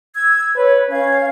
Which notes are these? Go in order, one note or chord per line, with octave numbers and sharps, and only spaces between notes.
E6 G#6
B4 C#5
C#4 F5 G#6